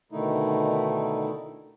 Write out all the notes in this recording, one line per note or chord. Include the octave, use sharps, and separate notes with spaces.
B2 D3 D#3 A3 D#4 E4